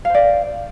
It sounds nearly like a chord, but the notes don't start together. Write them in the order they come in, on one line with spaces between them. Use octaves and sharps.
F5 C5 D5